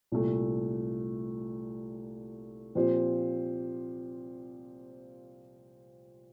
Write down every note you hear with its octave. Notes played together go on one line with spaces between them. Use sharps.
C2 A#2 A3
A#2 F3 C4 G4 C5